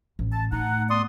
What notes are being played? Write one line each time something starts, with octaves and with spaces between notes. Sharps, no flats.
A1
A5
A2 D#4 F#5
B3 D5 C6 D#6